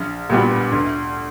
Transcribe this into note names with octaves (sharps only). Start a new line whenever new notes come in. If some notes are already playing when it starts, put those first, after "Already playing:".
Already playing: A#1
A#2 G3 B3 F#4
D2